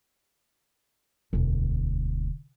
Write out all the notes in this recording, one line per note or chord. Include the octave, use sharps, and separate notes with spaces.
E1 D2